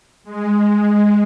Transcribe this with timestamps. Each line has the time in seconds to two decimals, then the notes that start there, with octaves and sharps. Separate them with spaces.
0.24 G#3